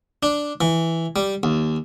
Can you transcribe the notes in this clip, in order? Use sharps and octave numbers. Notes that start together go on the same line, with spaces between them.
D4
E3
G3
D#2